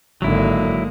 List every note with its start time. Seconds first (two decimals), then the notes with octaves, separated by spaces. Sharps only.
0.22 G#1 D3 F#3 G#3 A#3 E4